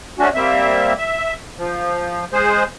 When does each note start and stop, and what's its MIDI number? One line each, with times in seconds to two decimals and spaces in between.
0.19 0.29 57
0.19 0.29 61
0.19 0.29 62
0.19 0.29 66
0.35 0.93 55
0.35 0.93 58
0.35 0.93 60
0.35 0.93 76
0.98 1.34 76
1.57 2.25 53
2.33 2.64 56
2.33 2.64 68
2.33 2.64 72